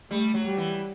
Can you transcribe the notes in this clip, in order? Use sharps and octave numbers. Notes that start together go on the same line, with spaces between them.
G3 A3
F#3
G3
E3